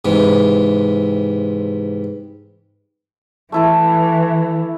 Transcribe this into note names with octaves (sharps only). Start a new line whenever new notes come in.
G#2 C3 E3
E3 A3 E4 A4